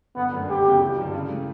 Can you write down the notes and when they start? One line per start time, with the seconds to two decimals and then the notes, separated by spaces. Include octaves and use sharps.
0.16 G1 B3
0.33 F#2 D3 A3
0.48 D2 G4
0.65 C#3 F#3 B3
0.81 A1
0.97 G2 D3 F#3
1.14 C#3
1.30 E3 A3